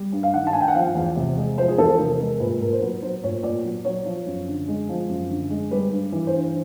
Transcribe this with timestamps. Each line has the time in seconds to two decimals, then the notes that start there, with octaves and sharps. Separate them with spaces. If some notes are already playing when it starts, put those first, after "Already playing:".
Already playing: G3
0.12 G2
0.23 F5
0.34 D#3 F#5
0.47 A5
0.53 G2 G#5
0.61 G5
0.68 F#5
0.75 F3 F5
0.95 E2
1.16 C3
1.37 G#3
1.58 F3 C5
1.68 G#4
1.78 E2 A4
1.99 C3 A#4
2.20 G#3 A#4
2.40 A#2 B4
2.61 A#2 A#4
2.73 C5
2.82 F#3 B4
3.03 F#3 C5
3.24 A#2 C#5
3.43 A#2 D5
3.64 F#3
3.85 F#3 C#5
4.06 F3
4.26 F#2
4.48 D3
4.68 G#3
4.89 F3
5.09 F#2
5.30 D3
5.50 G#3
5.71 G3 B4
5.92 G2
6.12 E3
6.27 C5
6.34 G2